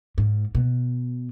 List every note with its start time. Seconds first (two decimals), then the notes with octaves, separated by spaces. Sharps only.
0.18 G#2
0.55 B2